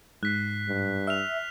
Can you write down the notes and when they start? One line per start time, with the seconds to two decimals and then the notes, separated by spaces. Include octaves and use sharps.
0.23 G#2 F#6 B6 C7
0.68 G2
1.07 E5 F6 F#6 F7